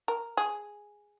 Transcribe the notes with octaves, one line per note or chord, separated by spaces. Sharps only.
A#4
G#4